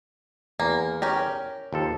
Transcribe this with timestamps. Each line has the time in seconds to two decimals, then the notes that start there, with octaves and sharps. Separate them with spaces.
0.60 E2 A#3
1.02 C#4 G4 A#4
1.73 D#2 F3 A4